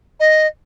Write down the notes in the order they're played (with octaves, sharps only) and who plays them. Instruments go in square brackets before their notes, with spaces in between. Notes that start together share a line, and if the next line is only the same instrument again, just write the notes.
[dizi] D#5